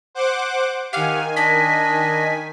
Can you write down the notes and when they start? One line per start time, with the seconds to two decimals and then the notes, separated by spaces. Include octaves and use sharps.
0.15 C5 F#5 D6
0.93 D#3 G4 F5 F#5 G#5
1.36 D4 D#5 B6